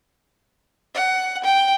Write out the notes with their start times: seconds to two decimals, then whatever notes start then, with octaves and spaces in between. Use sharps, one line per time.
0.95 F#5
1.44 G5